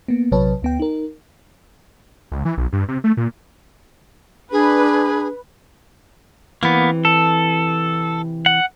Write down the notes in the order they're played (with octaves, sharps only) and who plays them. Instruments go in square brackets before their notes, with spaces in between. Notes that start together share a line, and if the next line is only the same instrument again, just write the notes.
[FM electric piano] A#3 B3
A#1 C3 F#3 B4 C#5 A5
D2 B3 G5
D#4 A#4
[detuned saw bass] C#2
E3
B1
G2
C3
A3
A#2
[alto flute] D4 [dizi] G#4 [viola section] B4
[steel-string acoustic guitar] C3 E3 [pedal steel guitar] A#3 B3
[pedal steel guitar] A4
F#5